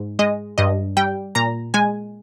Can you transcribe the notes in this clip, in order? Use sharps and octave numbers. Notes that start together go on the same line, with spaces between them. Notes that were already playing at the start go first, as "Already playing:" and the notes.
Already playing: G#2
G#3 D#5
G2 D#5
G3 G5
A#2 A#5
G#3 G#5